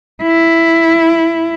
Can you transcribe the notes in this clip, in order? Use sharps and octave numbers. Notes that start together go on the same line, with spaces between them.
E4